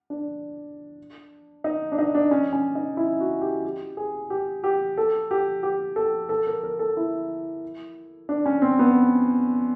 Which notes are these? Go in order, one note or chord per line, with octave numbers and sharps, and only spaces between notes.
D4
D#4
D4
D#4
D4
C#4
C#4
D#4
E4
F#4
G4
G4
G#4
G4
G4
A4
G4
G4
A4
A4
A#4
A#4
A4
E4
D4
C#4
C4
B3